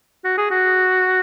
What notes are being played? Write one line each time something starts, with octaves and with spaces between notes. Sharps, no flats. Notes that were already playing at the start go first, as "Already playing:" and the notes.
F#4
G#4
F#4